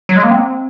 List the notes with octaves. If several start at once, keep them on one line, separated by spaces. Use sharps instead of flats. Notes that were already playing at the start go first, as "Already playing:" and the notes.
F#3
G#3
A#3
C4